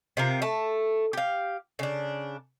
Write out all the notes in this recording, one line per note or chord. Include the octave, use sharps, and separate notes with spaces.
C3 F4 A#4
A3 A5
G4 F5
C#3 D4